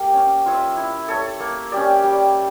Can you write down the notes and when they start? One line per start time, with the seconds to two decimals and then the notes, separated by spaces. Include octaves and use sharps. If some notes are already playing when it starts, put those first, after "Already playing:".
Already playing: A#3 G4
0.14 C#4
0.46 F4 C#5 E5
0.77 E4
1.08 A4 C#5
1.40 A#3
1.72 C#4 G4 D5
2.03 G3